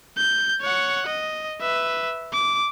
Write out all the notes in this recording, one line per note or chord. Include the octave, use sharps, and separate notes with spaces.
G6
C#5 F#5
D#5
B4 E5
D6